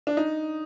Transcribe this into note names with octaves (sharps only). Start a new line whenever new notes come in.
D4
D#4